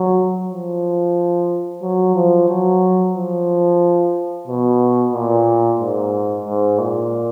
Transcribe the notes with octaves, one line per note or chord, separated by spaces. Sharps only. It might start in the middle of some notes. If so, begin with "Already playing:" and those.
Already playing: F#3
F3
F#3
F3
F#3
F3
B2
A#2
G#2
G#2
A#2